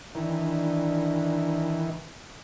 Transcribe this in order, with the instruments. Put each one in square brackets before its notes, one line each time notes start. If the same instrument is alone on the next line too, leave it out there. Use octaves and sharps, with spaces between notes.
[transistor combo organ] D#3 E3 [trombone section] D4